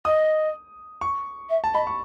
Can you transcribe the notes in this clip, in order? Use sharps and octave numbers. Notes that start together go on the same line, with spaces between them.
D#5 D#6
C#6
E5
A5
D#5 B5
C#6